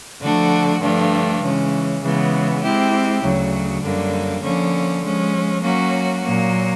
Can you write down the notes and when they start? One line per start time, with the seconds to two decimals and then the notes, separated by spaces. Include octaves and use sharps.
0.22 D3 F3 A3 D4 F#4
0.82 G2 D3 F3 A3 D4
1.42 C#3 E3 G#3 C#4
2.02 C#3 E3 G#3 B3
2.63 G#3 C4 E4 G4
3.23 D2 C#3 F#3
3.83 F#2 D3 G3 A#3
4.43 D3 F3 A#3 C#4
5.03 F3 G#3 C#4
5.63 F#3 A#3 C#4 F#4
6.24 A#2 F#3 A#3